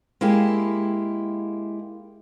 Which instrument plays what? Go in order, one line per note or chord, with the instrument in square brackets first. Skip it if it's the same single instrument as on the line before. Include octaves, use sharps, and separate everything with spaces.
[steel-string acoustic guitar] G#3 A#3 E4 G4